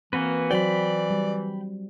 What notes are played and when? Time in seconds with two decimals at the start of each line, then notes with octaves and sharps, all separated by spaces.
0.13 E3 A#3 C4 F#4 B4
0.51 F#3 F#4 C5 D5 G5 B5
1.11 G3